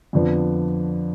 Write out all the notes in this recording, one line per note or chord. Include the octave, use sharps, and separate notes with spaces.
F2 D3 F3 B3